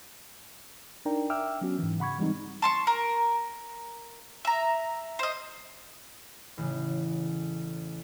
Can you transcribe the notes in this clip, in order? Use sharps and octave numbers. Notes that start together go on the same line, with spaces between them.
D4 D#4 A#4 D5 G5 A#5
E5 G5 D6 E6 F6
F#3 B3 C#4 F#4
G#2 E3
C#3 F#5 B5 C#6 G#6
E3 G3 G#3 C4 D#4
A5 C6 C#6
A#4
E5 A#5
C5 D#5
A1 C#3